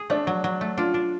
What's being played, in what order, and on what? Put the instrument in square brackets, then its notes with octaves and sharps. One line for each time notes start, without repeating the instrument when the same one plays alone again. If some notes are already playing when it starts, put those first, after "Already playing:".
Already playing: [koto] G#4
[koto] A3 [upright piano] D4
[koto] F#3
F#3
A3
[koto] D4 [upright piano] F4
[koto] D4